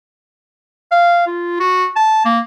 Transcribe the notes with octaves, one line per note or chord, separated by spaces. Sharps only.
F5
F4
F#4
A5
A#3